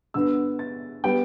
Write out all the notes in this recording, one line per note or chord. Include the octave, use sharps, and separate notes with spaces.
G2 D3 B3 E6
A6
G3 B3 G5